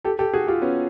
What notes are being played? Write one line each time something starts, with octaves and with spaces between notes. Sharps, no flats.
G4 A4
G4 A4
F#4 G#4
F4 G4
B3 C#4